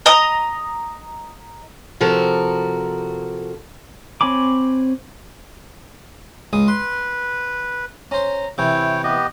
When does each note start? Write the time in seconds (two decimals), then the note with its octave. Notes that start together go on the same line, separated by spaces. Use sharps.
0.06 D#5 A#5 D#6
2.01 C3 F3 F#4 A4 A#4
4.21 C4 C#5 G#5 B5 D6
6.53 C#2 G#3 D#6
6.68 B4 C6
8.11 C#4 C5 A#5
8.58 C3 E3 E4 C#5 G5
9.04 B3 G4 D#5